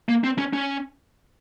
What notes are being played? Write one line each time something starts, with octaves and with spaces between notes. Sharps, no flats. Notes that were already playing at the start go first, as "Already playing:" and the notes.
A#3
C4
C#4
C#4